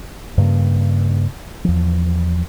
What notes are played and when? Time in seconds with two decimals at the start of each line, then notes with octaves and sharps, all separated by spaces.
0.38 G2 C#3 A#3
1.65 E2 F3